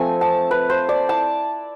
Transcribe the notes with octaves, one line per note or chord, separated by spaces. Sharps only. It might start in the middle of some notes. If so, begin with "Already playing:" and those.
Already playing: F3 A3 C4 G#5
A5
B4
C5
D5
E4 A5